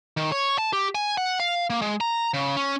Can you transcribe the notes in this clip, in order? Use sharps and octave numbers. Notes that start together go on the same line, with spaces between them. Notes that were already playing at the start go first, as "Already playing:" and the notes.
D#3
C#5
A5
G4
G#5
F#5
F5
A#3
G#3
A#5
C#3
C#4